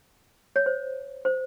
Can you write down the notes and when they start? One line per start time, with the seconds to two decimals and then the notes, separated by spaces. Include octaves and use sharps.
0.56 C#5
0.66 C5
1.25 C5